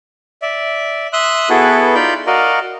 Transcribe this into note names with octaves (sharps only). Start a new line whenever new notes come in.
D5 E5
E5 C6 D#6 E6 F#6
B3 E4 F#4 G#4 A4 B4
D#4 F4 D5 B5 G6
F#4 A#4 D5 D#5 F5